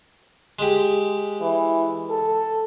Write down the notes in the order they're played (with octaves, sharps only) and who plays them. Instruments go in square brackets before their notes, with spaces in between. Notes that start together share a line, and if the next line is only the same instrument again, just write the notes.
[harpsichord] G#3 G4
[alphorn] E3
A4